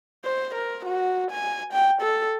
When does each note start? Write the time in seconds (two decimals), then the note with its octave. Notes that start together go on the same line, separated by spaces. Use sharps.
0.25 C5
0.54 A#4
0.86 F#4
1.31 G#5
1.73 G5
2.02 A4